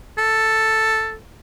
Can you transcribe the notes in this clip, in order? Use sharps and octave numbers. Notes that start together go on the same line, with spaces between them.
A4